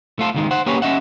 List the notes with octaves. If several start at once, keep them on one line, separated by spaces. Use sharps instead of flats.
A3 F4 A4
C#2 D#3 G#3
C5 F#5
A#3 C#4 G4 G#4 B4 C#5
C#4 D#5 E5 F#5